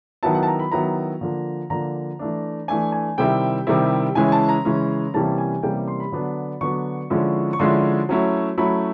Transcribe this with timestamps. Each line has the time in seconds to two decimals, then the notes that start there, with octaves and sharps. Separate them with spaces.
0.23 D#3 F#3 B3 E4 A5
0.35 F#5
0.43 A5
0.47 A#5
0.59 B5
0.72 D#3 F#3 B3 E4 A#5
1.21 D3 F3 A#3
1.70 D3 F3 A#3 A#5
2.19 E3 A3 D4
2.68 E3 A3 D4 G#5
2.92 G#5
3.18 C3 D#3 G3 C4 E4 G5
3.67 C3 D#3 G3 C4 E4
4.15 C#3 E3 G#3 C#4 E4 G#5
4.32 A5
4.49 A#5
4.65 C#3 E3 G#3 C#4 E4
5.14 C3 E3 G3 A#3 C#4 A5
5.38 G#5
5.63 C3 E3 G3 A#3 C#4 G5
5.88 C6
6.00 B5
6.12 D3 F#3 B3 D4
6.61 D3 F#3 B3 D4 C#6
7.10 D3 F3 G#3 C#4 E4
7.53 C#6
7.59 D3 F3 G#3 C#4 E4 C6
8.09 F#3 A3 C#4 E4
8.58 F#3 A3 C#4 E4 B5